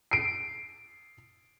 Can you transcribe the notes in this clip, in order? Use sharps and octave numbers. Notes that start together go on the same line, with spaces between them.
C7 D7